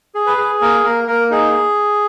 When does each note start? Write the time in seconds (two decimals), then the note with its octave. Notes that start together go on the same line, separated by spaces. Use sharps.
0.15 G#4
0.26 B4
0.37 G#4
0.61 A#3 A#4
0.84 A#3 A#4
1.07 A#3 A#4
1.30 D#4 G#4